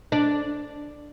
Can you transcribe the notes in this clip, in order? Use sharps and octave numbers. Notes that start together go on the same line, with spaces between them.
D4